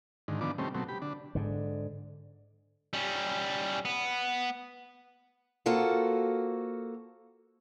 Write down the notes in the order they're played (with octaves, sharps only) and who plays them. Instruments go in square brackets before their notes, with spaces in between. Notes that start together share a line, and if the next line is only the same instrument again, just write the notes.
[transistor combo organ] G#2 D3 D#3
D3 D#3 F3 B3 D4 D6
C3 D#3 G3 A3 C4 C#4
B2 F#3 A3 C4
G4 B5
D3 D4
[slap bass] G#2 D3
[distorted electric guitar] G3 C#4
B3
[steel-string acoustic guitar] A#3 F4 F#4 A4 C5